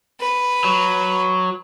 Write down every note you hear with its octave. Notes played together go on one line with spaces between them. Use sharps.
B4
F#3